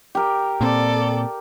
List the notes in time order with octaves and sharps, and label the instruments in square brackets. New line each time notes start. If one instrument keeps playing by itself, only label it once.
[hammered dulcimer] G4 A#4
[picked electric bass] A#2 C4 [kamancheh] A4 D5